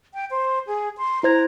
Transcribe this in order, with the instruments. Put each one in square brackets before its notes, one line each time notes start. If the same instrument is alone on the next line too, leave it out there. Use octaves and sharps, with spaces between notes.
[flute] G5
C5
G#4
C6
[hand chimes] E4 C5 G#6 [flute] A#5